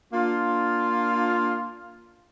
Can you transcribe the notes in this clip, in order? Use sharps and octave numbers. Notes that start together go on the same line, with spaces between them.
A#3 D4 F4